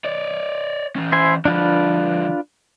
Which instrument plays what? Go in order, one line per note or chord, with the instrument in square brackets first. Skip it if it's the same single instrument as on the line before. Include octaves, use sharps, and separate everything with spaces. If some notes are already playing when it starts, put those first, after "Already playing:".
[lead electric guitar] C#5 D5
E3 C#4
[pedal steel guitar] E4 C5 G#5
[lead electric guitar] D3 F3 [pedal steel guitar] D4 F4 B4